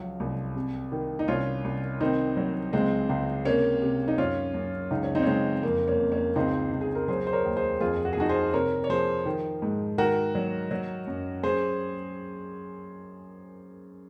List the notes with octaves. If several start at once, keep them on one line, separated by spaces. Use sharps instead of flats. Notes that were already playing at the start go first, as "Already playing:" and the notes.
Already playing: C#2 F3 F#3
C2
C3
D#3
D#4
C2 C#4 F4
C2
D#3 C4 D#4
F#3
C#2 G#3 C4
C#2
C3 A#3 C#4
C3
D#4
F#2 C#4 F4
F#2
C#2 D#4
C#4
C4 D#4
C#4
C#2 G#3 C4
F2 A#3
A#3 C#4
F2
A#3 C#4
C#2 C4 D#4
C#2
G#4
A#4
F#3 G#4 C5
C5
A#4 C#5
D#2
G#4 C5
F2 F4 G#4
F#4
G#4
F3 D#4 F#4
G#4 C5
C3 A#4 C#5
C#5
F3 G#4 C5
D#3
G#2
D#3 F#4 A#4
F#3
F#3
F#2
F#2 G#4 C5